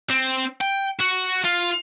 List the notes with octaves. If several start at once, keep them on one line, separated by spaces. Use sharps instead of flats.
C4
G5
F#4
F4